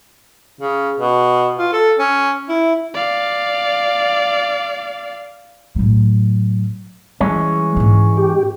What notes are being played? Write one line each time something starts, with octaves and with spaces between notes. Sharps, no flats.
C#3
B2
F4
A4
C#4
E4
D5 F5
A2 F#3
E3 G3 G#3 C#4
G#2 D#4
G4